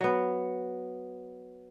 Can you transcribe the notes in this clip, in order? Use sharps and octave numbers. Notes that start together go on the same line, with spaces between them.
F#3 B3